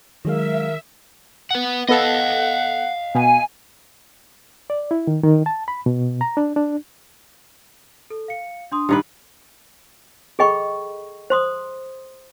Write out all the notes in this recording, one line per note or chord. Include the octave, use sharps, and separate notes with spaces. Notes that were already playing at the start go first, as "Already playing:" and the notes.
D#3 F#3 G#3 A#4 E5 F5
B4 F#5
B3 A4 D#5 F5 F#5
B2 G#5
D5
E4
D#3
D#3
A5
B5
B2
A#5
D4
D4
A4
F5 C#7
D4 C6 D#6
G2 D#3 B4
G#4 A4 D#5 G5 B5 C#6
C5 C6 D#6